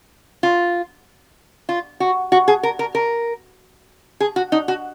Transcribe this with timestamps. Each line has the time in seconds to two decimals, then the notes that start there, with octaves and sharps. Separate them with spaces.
0.43 F4
1.69 F4
2.00 F#4
2.32 F#4
2.48 G#4
2.63 A#4
2.79 A#4
2.95 A#4
4.20 G#4
4.36 F#4
4.52 D#4
4.68 F#4